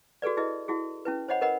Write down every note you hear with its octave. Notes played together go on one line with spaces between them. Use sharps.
F#4 G#4 A4 B4 D5
E4 G#4 B4 D#5
E4 F#4 G#4
C#4 E4 B4
C5 C#5 D#5 F#5 B5
A#4 B4 D#5 F#5 B5